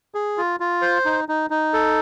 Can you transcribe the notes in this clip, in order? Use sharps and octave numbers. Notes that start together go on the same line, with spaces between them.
G#4
F4
F4
C5
D#4
D#4
D#4
A4